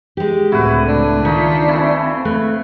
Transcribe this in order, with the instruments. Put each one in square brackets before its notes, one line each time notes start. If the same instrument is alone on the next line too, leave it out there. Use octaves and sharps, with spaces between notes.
[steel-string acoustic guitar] G#3 G4
[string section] C#2 A2 D3 [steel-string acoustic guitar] C4 [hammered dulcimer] E4 B4 [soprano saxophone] F#4
[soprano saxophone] D4
[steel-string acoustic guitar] D#3 [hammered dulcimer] D#4 C#5 [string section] F4 B6
[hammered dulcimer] C#3 A3 E4 [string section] C4
[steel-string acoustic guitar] A3 [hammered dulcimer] B4